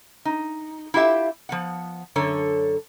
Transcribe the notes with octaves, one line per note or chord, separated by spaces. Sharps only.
D#4
E4 F4 G4 E5
F3 B3 F#5
F#2 D3 A4 C#5